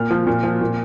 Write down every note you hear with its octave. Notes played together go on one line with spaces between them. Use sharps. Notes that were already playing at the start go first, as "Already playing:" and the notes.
Already playing: A#2 F6
F3
A#2
F3
A#2